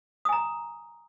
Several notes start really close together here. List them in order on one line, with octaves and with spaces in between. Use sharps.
D#6 G#5 A#5